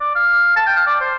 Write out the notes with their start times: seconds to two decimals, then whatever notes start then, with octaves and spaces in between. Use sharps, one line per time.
0.01 D5
0.15 F5
0.57 A5
0.67 G5
0.77 F5
0.87 D5
1.01 C5